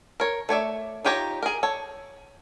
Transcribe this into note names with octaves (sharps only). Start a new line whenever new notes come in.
A#4 C#5
A3 C#5 D5 E5
D#4 F4 G4 C#5 A#5
G#4 A#4
A4 C#5